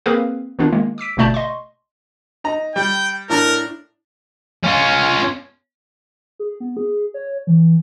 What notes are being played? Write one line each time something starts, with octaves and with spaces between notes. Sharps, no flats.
A#3 C4 G#4 A#4 B4 F5
D#3 B3 D4 D#4 F4
D#3 G#3 A#3
D6 E6 B6 D7
G1 B2 A3 D5 A5 G6
D#5 C6 C#6
D#4 A#5
G3 G5
A2 D4 A#4 A#5
C#4 F4
G#4
B3
G#4
C#5
E3